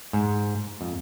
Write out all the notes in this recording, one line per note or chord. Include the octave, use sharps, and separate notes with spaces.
G#2
F2